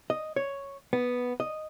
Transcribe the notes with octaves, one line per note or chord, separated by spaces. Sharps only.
D#5
C#5
B3
D#5